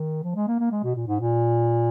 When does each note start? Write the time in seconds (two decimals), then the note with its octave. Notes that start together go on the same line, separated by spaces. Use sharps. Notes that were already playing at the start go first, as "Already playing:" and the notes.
Already playing: D#3
0.24 F3
0.35 G#3
0.48 A#3
0.59 A#3
0.71 G#3
0.83 B2
0.95 A#2
1.07 G#2
1.20 A#2